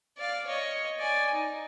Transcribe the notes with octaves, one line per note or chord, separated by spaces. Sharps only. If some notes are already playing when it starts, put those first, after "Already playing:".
D5 F5
C#5 D#5
D5 G#5
D#4